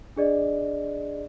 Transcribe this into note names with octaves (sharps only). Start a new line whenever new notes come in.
D4 G#4 D5 D#5